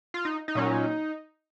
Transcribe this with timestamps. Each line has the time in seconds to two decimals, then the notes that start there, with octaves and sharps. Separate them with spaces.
0.14 F4
0.25 D#4
0.48 D#4
0.55 A#2 F#3 C#4